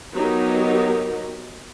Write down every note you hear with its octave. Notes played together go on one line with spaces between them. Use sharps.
F#3 B3 D#4 G4 A#4